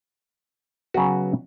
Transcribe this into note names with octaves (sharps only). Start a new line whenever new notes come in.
C#3 F#3 B3 F#4 B4